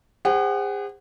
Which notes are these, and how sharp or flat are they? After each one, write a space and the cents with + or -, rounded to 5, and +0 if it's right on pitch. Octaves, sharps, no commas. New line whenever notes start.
G#4 -40 C5 +0 F#5 +20